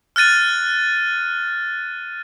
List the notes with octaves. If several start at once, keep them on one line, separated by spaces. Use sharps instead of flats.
F6 F#6 A6 D#7